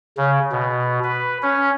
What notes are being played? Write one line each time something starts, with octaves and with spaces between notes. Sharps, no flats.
C#3
B2
B4
C#4